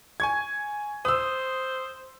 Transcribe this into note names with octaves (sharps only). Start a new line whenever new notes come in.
G#5 C#6 G#6
C5 D#6 E6